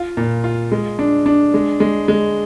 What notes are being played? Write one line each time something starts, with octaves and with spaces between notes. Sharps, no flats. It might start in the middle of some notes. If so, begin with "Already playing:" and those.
Already playing: F4
A#2
F4
G#3
D4
D4
G#3
G#3
G#3